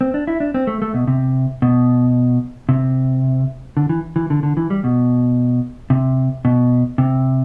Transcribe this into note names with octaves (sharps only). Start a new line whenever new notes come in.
C4
D4
E4
D4
C4
A3
A3
B2
C3
B2
C3
D3
E3
E3
D3
D3
E3
G3
B2
C3
B2
C3